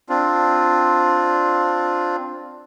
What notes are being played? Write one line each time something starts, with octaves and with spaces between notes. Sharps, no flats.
C4 D4 F4